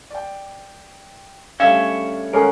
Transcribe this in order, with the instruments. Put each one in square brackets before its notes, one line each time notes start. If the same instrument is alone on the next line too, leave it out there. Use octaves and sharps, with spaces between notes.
[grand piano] D5 G5
[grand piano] G3 A3 D4 [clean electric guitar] C#4 C#5 E5 [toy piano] F5
[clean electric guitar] D#2 G#3 [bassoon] C#4 [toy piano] A4 [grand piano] A#4 F#5